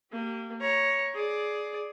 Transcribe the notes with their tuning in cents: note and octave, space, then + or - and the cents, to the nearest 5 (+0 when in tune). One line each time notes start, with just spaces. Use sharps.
A#3 -35 G4 -25
C#5 +0 A#5 +20
G#4 +15 D5 +0